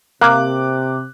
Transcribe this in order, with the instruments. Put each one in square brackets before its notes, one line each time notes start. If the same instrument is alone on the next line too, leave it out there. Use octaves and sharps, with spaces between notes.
[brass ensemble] C3 [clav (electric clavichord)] A#3 [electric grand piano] D6 F#6